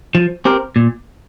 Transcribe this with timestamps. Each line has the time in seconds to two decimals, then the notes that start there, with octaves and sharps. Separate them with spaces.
0.15 F3
0.45 C4 G4 A#4
0.76 A#2